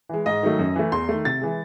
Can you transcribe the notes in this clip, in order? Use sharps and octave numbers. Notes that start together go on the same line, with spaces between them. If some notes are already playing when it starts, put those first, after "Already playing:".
E3 G#3
G#2 D#5
D#3 F#3 A3
F#2
E3 A3
E2 C6
D#3 A3
C3 A6
E3 G#3